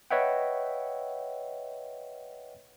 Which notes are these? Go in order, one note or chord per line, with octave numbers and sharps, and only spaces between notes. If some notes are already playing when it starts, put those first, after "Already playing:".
B4 C#5 D#5 E5 F#5 G5